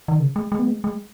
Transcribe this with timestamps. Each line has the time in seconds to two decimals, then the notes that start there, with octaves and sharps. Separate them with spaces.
0.08 D#3
0.20 C#3
0.36 G#3
0.52 G#3
0.59 B3
0.68 G#3
0.84 G#3